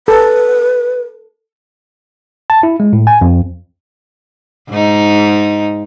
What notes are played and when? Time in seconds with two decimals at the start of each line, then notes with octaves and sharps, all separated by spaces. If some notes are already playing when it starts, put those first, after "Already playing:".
0.08 A4 B4
2.50 A5
2.63 E4
2.80 G#3
2.93 A2
3.07 G#5
3.21 F2
4.70 G#2 D#4